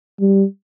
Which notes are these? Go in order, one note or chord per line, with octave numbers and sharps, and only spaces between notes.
G3